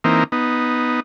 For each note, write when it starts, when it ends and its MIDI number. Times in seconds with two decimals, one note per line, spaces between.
0.04 0.24 52
0.04 0.24 58
0.04 0.24 60
0.04 0.24 63
0.32 1.00 59
0.32 1.00 63